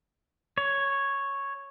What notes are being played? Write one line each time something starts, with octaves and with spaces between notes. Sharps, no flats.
C#5